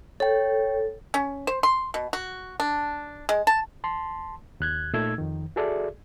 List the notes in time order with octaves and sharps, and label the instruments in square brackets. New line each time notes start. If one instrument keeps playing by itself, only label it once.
[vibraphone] A4 [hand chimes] C#5 G5
[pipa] C#4
C5
C6
B2
F#4
D4
G#3
A5
[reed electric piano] A5 C6
D#2 F#6 G#6
A#2 A3 D#4 E6 G#6
F2 D#3
F#4 G#4 A4 D5 E5